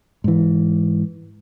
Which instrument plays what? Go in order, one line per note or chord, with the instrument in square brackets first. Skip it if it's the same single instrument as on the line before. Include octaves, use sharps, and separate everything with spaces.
[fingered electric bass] G#2 E3